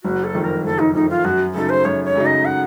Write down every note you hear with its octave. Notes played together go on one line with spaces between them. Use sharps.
F#1 F#4
A4
F2 D#3 A3
A#4
F#1 A4
D#4
F2 D#3 A3 D#4
F4
F#2 F#4
C#3 F#3 A3 D#4 A4
C5
F#2 C#5
C#5
C#3 F#3 A3 D#4
D#5
F#5